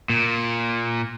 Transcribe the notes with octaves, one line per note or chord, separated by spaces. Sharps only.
A#2